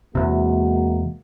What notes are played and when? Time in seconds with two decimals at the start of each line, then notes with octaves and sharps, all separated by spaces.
0.15 E2 C3 G#3 A#3 F#4